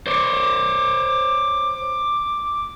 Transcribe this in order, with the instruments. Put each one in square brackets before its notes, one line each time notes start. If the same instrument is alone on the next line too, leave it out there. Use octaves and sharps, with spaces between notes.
[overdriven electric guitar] C5 C#5 [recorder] D6